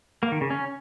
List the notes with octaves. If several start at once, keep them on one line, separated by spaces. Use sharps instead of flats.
A#3
D#3
C#3
C#4